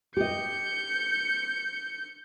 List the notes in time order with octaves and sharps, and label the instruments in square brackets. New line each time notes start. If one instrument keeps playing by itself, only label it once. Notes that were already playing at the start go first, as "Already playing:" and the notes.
[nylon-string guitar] G4 D#5 [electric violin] G6 C#7